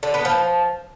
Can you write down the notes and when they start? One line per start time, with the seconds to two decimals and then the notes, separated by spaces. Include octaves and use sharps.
0.03 D3
0.14 B3
0.25 F3